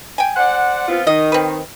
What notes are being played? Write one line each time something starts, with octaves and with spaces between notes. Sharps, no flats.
G5 G#5
C5 D5 F#5
B3 C4 F4
D#3 D#5
C4 B4